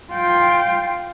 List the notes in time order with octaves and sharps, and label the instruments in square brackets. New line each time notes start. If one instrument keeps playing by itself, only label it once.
[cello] F4 G5